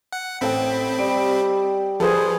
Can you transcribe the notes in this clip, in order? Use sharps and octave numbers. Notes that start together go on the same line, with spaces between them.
F#5
A1 C4 A4 G5 B5
G3 D#5 D7
F3 G#4 A4 B4 C5